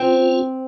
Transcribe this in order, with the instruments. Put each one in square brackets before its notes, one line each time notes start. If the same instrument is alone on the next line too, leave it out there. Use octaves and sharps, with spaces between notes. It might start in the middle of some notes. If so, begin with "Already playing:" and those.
Already playing: [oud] C4 [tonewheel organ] C#4 F4